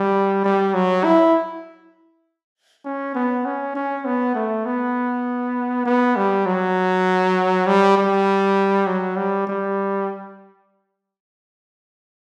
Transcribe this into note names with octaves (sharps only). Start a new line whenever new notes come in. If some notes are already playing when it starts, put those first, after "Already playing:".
Already playing: G3
G3
F#3
E4
C#4
B3
C#4
C#4
B3
A3
B3
B3
G3
F#3
G3
G3
F#3
G3
G3